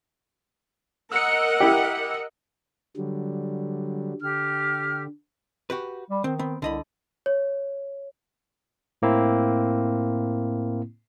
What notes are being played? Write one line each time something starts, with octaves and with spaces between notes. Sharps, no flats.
A#4 D#5 F#5 E6 C#7
E4 G4
D3 F#3 G3
D3 G4 F6
F#4 G4 B4
G3
D#3 C4
B3 C4
C2 D3 D#5 B5
C#5
A2 A#3 C4 E4